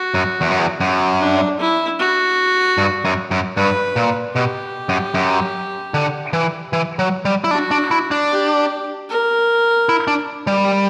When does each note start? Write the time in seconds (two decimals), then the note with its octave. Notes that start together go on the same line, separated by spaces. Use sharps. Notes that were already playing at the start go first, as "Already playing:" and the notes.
Already playing: F#4
0.14 F#2
0.41 E2
0.51 F#2
0.59 E2
0.80 F#2
1.20 D4
1.60 E4
1.99 F#4
2.78 G2
3.05 F#2
3.31 F#2
3.57 G2 B4
3.96 A#2
4.35 B2 G4
4.89 F#2
5.14 F#2
5.94 D3
6.33 E3
6.73 E3
6.99 F#3
7.25 G3
7.44 E4
7.51 D4 F#4
7.71 D4
7.91 E4
8.11 D4
8.30 G4
9.09 A#4
9.89 E4
10.08 D4
10.47 G3